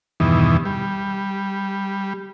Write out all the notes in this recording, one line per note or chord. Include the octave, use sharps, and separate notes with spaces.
E2 G2 B2 D#3 E3
G3